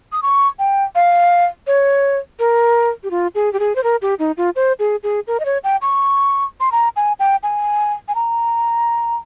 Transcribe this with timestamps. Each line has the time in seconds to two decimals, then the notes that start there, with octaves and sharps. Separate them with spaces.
0.12 D#6
0.23 C#6
0.59 G5
0.95 F5
1.67 C#5
2.39 A#4
3.04 G4
3.11 F4
3.35 G#4
3.53 G4
3.60 G#4
3.76 C5
3.84 A#4
4.02 G4
4.19 D#4
4.37 F4
4.56 C5
4.79 G#4
5.03 G#4
5.27 A#4
5.40 D#5
5.45 C#5
5.64 G5
5.82 C#6
6.60 C6
6.72 A#5
6.96 G#5
7.20 G5
7.43 G#5
8.08 G#5
8.15 A#5